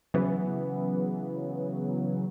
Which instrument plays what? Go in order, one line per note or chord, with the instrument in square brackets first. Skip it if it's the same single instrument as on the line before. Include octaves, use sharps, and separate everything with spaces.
[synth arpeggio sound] C#3 E3 F#3 B3